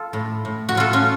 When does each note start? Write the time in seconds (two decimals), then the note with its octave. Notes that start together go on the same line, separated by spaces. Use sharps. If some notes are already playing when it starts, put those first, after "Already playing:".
Already playing: F4 A4
0.13 A2
0.45 A2
0.69 F#4
0.75 A2 F4 A4
0.93 C#4 F4